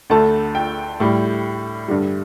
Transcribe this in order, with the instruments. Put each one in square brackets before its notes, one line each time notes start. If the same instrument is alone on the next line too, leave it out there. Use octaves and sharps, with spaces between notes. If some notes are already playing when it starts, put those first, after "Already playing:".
[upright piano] D2 D3 A3 A5
G5
A2 G3
G2 D3 G3